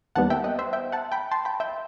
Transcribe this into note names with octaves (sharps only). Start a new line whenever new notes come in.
D#2 D#3 G3 B3 F#5 A5
E5 G5
D#5 F#5
C5 E5
E5 G5
F#5 A5
G5 B5
A5 C6
G5 B5
E5 G5